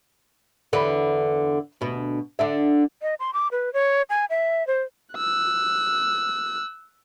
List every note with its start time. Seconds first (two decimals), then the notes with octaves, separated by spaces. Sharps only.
0.73 E2 D3 B4
1.81 D2 B2
2.39 D3 D4 E5
3.02 D#5
3.20 C6
3.33 D6
3.52 B4
3.73 C#5
4.10 G#5
4.30 E5
4.67 C5
5.16 E6 F#6